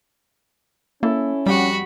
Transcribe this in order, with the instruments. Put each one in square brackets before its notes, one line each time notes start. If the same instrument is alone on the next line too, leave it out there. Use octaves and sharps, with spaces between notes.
[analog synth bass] A#3 [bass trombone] C#4 [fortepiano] E4 A4
[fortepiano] F2 G4 F#5 [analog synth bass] G3 [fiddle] F#4 B5